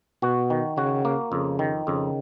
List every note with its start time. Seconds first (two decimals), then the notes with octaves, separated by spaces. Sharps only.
0.22 B2 F#4
0.50 D#3
0.77 C#3 F#4
1.05 A#3
1.32 F2 C#3
1.59 D#3
1.87 F2 C#3